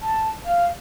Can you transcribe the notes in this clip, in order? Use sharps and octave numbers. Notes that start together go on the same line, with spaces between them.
A5
F5